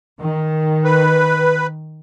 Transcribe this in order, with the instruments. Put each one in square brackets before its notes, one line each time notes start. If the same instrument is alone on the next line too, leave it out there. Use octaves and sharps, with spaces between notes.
[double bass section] D#3
[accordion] B4